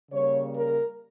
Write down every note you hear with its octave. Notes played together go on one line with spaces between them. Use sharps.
C#3 G3 A#3 C#5
A#4